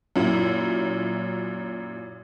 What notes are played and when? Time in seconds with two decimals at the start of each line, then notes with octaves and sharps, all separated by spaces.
0.16 F#2 A#2 E4